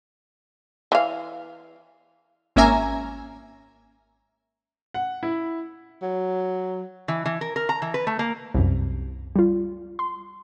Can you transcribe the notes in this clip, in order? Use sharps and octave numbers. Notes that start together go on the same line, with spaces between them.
E3 F5
G#1 A#3 C#4 E5 G#5 A#5
F#5
E4
F#3
E3
E3
A#4
A#4
A#5
E3
B4
A3
A#3
C2 F#2
G3 F4
C6